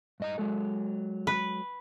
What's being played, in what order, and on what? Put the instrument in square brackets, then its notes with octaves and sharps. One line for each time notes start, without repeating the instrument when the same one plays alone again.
[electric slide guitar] G2 D#5 A#5
F#3 G#3 A4
[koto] B4